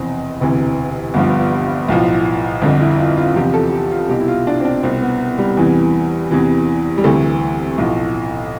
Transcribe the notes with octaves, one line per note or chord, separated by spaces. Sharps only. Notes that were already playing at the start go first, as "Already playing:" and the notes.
Already playing: F1 E2 B2 C4
E1 D2 C3 E3
G1 G2 F3 B3
B1 A2 F3
G1 F2 D3 D4
E4
F4
F4
E2 C3 F3 G4
A4
G4
F4
C2 B2 G4
E4
F4
D4
C4
D4
C2 B2 C4
B3
G3
E2 C3 E3
E2 C3 E3
G3
D2 C3 E3 A3
B1 A2 F3